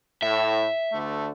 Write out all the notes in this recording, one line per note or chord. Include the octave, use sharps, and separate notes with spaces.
A2 E5
D2 D3 A3